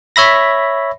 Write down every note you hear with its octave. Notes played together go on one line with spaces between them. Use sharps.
C#5 E5 B5 A#6